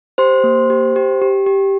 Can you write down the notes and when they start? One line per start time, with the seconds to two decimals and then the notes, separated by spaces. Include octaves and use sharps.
0.18 G4 C5 C6
0.44 A#3
0.70 G4
0.96 G4
1.21 G4
1.46 G4